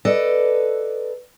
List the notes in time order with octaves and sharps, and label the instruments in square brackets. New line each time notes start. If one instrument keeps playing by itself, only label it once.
[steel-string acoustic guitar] A4 B4 D5 D#5